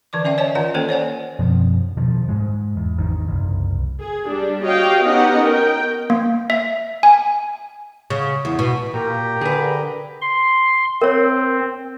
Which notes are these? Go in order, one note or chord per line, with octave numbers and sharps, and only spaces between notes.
D3 E3 D5 D6
C#4 D5 E5 G5
C#5 D#5 G#5 A5
D#3 F4 D5 F#5 A5
A#3 C#4 A4 C5 G5
C#5 D5 F#5 G#5
F#2 B2 F3 C4
F2 B2 D#3 F3
G#2 G#3
E2
G#1 E2 D#3
F#1 C2
G#4
G3 D4
F#4 G4 C#5 D#5 F5 G5
B3 C#4 D#4 G4 D#5 F#5
A#4 G5
A#3
E5
G#5
C#3
E2
B2
A#2 G4 A#4 G5 A#5
D3 G#4 B4
C6
C4 A#4 C#5